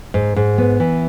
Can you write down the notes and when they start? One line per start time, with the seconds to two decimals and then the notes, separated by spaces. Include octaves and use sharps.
0.14 G#2
0.36 G#2
0.58 B3
0.80 E3